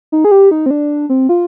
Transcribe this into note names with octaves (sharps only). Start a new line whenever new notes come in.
D#4
G#4
G4
D#4
C4
D4
C4
F4